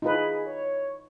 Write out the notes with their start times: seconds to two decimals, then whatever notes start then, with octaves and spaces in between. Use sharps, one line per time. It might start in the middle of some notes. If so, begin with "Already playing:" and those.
0.02 D#4 F4 G#4 B4
0.46 C#5